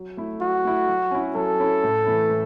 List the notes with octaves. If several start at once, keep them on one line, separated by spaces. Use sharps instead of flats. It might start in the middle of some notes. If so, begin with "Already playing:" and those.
Already playing: F#3
A3 E4
F#3 F#4
A3 E4
F#3
C#4 E4
F#3 A4
C#4 E4
A2
E3 A3 E4
A2